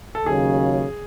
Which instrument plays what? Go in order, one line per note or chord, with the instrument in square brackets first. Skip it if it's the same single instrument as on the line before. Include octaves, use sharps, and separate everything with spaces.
[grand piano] A4
[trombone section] D#2 C#3 F#3 [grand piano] G#4